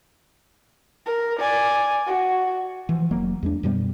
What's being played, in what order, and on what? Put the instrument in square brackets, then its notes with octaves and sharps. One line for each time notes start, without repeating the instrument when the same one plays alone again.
[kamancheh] A#4
D5 G#5
F#4
[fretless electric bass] E3 F3
F1 F#3 A#3
E2 G#3 D4
F#2 B2 G3 B3